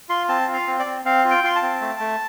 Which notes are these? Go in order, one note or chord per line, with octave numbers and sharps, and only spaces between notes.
F4 C6
C4 A5
F4
F5
C4
D5
C4
C4 F5
F4
G5
F4 C6
A5
C4
A3
A3